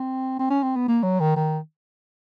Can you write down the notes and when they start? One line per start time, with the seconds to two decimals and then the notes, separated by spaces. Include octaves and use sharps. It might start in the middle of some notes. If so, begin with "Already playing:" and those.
Already playing: C4
0.39 C4
0.50 C#4
0.63 C4
0.76 B3
0.88 A#3
1.03 F#3
1.20 D#3
1.36 D#3